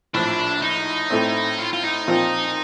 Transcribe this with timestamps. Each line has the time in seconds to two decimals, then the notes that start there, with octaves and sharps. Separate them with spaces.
0.14 A#1 A2 F3 D4
0.62 D#4
1.10 A2 A3 C4
1.59 F4
1.73 F4
1.83 D#4
2.08 A#2 F3 C4 F4